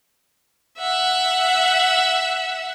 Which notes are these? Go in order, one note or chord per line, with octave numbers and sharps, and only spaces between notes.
E5 F#5